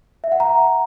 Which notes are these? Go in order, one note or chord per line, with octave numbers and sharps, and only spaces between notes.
E5
F#5
A#5